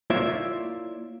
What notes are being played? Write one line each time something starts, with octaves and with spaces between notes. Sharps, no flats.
A#3 E4 F4 C#5 D5 E5